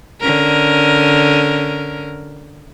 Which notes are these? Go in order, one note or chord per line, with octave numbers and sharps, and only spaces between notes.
D3 C#4 A#4